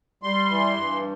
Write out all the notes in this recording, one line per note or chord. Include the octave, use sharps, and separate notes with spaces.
G3 C6
E3
G2